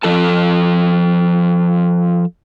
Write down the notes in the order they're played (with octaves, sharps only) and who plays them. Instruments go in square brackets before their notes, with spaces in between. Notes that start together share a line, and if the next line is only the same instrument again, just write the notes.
[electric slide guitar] F3 A4 A5